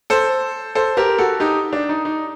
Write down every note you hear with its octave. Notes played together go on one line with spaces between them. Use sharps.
A4 C5
A4 C5
G4 A#4
F#4 A4
D#4 G4
D4
D#4
D#4